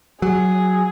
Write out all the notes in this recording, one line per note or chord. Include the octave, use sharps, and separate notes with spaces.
F#3 G#4